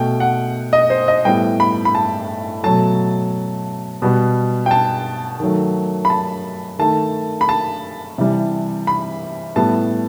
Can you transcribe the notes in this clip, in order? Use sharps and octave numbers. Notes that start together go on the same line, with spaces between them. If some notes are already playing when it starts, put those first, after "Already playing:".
Already playing: B2 A3 G5
F#5
D#5
C5
D#5
A2 G3 B3 G5
B5
B5
A5
B2 F#3 A3 A5
B2 G3 B3
G5
A5
D#3 F#3 A3
B5
A5
D#3 A3 A5
B5
A5
C3 E3 G3
B5
A2 G3 B3 A5